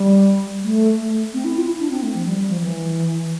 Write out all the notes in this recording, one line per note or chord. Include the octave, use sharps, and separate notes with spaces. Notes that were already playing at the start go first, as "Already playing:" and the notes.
Already playing: G3
A3
A3
C4
E4
F4
E4
D4
C4
A3
F3
G3
G3
F3
E3